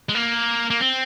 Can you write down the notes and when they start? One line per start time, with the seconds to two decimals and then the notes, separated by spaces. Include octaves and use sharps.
0.09 G#3
0.15 A#3
0.70 A#3
0.80 C4